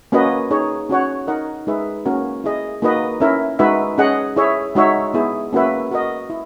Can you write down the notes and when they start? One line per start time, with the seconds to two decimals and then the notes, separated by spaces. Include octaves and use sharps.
0.12 A#3 C#4 F#4 B4 D#5
0.51 D#4 G#4 C#5
0.89 C#4 F#4 C#5 F#5
1.27 D#4 A#4 D#5 F#5
1.67 G#3 D#4 G#4 B4 E5
2.06 A#3 C#4 F#4 A#4
2.44 E4 G#4 D#5
2.82 A#3 D#4 F#4 B4 D#5
3.20 C#4 E4 A#4 E5
3.59 G#3 D#4 F#4 B4 E5
3.98 C#4 G#4 D#5 F#5
4.36 E4 G#4 C#5 E5
4.75 G#3 D#4 F#4 C#5 E5
5.14 B3 E4 G#4
5.53 A#3 C#4 F#4 B4 E5
5.91 F#4 A#4 D#5
6.30 E4